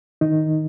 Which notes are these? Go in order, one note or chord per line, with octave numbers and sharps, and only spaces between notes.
D#3 D#4